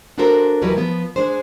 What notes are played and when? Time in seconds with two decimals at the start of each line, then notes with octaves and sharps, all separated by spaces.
0.18 D4 F4 F#4 A4 A#4 C5
0.62 D#2 E3 F#3 G3 A#4 B4
0.76 F3 B3
1.16 G#3 D4 G#4 C5